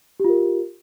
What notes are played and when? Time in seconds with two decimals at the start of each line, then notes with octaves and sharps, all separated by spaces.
0.20 G4
0.24 F4
0.29 A#4